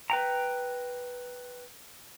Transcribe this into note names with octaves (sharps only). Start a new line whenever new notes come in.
B4 G5 A#5